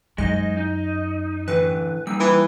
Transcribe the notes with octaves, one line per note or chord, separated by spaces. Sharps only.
F#2 G#3 D#4 D#5
D#4
A2 D3 E3 B4
G3 A#3 D#4 E6
E3 B4